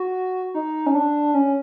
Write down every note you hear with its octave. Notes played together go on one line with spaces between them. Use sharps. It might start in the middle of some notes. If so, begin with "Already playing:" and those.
Already playing: F#4
D#4
C#4
D4
C#4